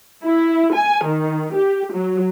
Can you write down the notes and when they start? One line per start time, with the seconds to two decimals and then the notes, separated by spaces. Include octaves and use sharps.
0.24 E4
0.75 G#5
1.06 D#3
1.56 G4
1.93 F#3